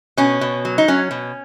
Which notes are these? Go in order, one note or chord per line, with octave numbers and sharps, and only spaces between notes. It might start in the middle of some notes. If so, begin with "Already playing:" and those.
B2 C#4
B2
F#3
D#4
F#3 C#4
B2